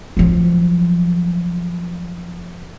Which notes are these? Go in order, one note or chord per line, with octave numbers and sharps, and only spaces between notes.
F3 F#3